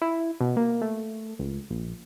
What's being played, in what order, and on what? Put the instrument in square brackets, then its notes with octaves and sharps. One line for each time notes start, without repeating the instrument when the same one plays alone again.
[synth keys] E4
B2
A#3
A3
C#2
A#1